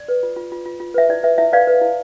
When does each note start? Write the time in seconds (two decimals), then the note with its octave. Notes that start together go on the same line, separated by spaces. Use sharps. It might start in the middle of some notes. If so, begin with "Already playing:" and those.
Already playing: D5
0.08 B4
0.23 F4
0.36 F4
0.52 F4
0.66 F4
0.80 F4
0.94 B4 E5
1.09 E4 D5
1.23 B4 E5
1.38 E4 E5
1.53 B4 D5 F5
1.67 B4
1.81 E4